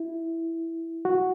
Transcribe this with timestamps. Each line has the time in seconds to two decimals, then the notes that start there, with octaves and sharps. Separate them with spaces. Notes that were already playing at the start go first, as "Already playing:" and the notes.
Already playing: E4
1.05 F#4